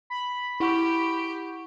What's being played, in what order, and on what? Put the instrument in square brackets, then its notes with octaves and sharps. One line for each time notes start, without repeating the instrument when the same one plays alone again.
[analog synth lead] B5
[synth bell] E4 F#5 C#6 [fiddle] G4